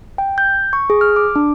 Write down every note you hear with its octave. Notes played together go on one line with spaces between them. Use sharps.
G5
G6
C#6
G#4
F6
D6
D4